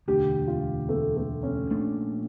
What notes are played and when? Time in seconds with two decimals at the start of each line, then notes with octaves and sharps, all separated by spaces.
0.08 E1 D2 D3 G4
0.48 F4
0.89 A3
1.17 A3
1.43 C#4
1.70 A#1 A#2 A3 D4